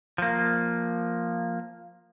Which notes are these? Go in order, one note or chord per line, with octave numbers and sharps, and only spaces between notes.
F3 A#3